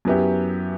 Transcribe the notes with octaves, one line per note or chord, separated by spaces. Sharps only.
F#2 F#3 B3 E4 G4